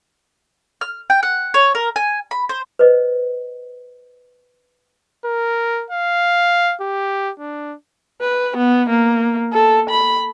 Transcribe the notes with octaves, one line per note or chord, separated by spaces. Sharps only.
F6
G5
F#5
C#5
A#4
G#5
B5
C5
B4 C5 D#5
A#4
F5
G4
D4
B4
B3
A#3
A4
B5